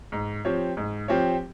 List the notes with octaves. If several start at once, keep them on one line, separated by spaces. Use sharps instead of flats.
G#2
F3 C4 G4 C#5
G#2
F3 C4 G4 C#5